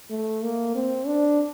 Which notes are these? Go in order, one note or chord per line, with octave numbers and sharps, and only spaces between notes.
A3
A#3
C4
D4